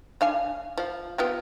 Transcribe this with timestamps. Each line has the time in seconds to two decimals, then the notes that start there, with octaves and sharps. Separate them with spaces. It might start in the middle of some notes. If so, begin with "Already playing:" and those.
0.21 D4 F5 G#5
0.77 F3 F5
1.18 B3 F4 G4